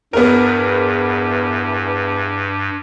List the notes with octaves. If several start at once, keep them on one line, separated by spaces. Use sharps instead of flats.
E2 G2 B3 A#4